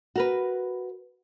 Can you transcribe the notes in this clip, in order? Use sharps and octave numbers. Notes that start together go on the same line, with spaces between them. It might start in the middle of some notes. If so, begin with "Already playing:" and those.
F#4 A#4 B4